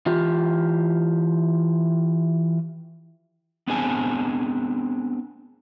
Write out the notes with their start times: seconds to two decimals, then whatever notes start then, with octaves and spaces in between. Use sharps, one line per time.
0.06 E3 F4 G4
3.68 B3 C4 D4 G#4 G#5 A5